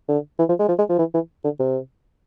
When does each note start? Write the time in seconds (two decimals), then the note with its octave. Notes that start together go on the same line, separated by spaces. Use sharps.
0.09 D3
0.39 E3
0.49 F3
0.59 G#3
0.68 F3
0.78 G#3
0.89 F3
0.99 E3
1.14 E3
1.44 D3
1.60 C3